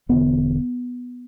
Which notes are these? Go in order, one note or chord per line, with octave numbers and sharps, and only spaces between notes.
E1 E2 D3 B3